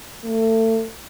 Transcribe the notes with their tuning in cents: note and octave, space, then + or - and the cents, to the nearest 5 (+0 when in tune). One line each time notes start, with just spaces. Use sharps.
A3 +30